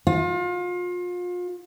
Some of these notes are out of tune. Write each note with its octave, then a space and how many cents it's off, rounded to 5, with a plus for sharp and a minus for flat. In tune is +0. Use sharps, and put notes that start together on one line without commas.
F4 +35